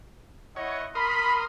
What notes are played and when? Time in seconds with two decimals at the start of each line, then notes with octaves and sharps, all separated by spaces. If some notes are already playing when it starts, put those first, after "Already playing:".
0.56 E4 C#5 D#5 F#5
0.95 A#4 B5 C6 D#6